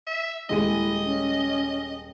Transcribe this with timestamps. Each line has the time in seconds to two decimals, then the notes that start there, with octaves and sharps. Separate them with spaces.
0.07 E5
0.49 D#1 G#3 E4 D#5 D#7
1.04 C#4